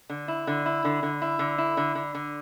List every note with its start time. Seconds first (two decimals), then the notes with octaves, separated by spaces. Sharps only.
0.09 D3
0.28 E4
0.47 D3
0.66 E4
0.84 D3
1.03 D3
1.22 E4
1.39 D3
1.58 E4
1.77 D3
1.95 D3
2.15 D3